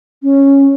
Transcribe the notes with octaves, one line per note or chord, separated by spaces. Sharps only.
C#4